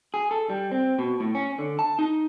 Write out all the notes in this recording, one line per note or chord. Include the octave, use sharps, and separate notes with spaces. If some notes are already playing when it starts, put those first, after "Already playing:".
G#4
A4
G3
C4
B2
A2
C#4
D3
A5
D#4